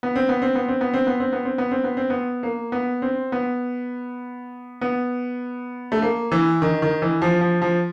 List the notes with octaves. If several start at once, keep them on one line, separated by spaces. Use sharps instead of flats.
B3
C4
B3
C4
B3
C4
B3
C4
B3
C4
B3
C4
B3
C4
B3
C4
B3
A#3
B3
C4
B3
B3
A3
A#3
E3
D#3
D#3
E3
F3
F3
F3